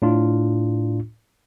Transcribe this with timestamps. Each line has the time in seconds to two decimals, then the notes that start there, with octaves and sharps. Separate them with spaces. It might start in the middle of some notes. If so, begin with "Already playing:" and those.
0.02 A2 D4 F4